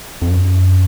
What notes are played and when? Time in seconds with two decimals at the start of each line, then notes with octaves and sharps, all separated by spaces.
0.22 F2
0.30 F#2